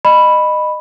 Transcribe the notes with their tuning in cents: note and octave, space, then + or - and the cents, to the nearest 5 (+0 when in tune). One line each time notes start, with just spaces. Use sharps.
D#5 -25 B5 +0